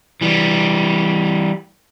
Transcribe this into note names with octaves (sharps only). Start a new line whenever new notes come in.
E3 G3